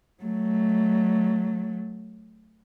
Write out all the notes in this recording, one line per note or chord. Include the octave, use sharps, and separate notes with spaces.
F#3 A3